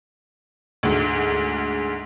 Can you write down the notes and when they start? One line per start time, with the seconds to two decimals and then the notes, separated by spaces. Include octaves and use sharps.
0.83 D2 G#2